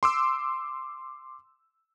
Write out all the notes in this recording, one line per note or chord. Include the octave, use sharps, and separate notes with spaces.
C6 D6 E6